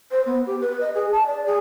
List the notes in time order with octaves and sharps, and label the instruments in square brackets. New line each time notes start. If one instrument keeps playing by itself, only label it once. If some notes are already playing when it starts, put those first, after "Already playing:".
[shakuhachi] C5
B3
G4
B4
D#5
G#4
A5
D5
G#4